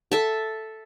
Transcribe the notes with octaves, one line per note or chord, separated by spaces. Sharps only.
A4 E5 A5